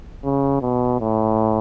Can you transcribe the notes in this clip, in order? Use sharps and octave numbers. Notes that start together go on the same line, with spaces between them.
C#3
B2
A2